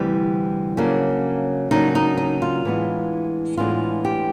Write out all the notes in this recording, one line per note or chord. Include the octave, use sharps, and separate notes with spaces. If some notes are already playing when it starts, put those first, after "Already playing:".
Already playing: D2 C3 E3 G3
C#3 F#3 A#3 D4
C#3 F#3 A#3 D4 D#4
D#4
D#4
F4
A2 E3 G#3 B3 D4
A2 E3 G#3 B3 D4 F4
G4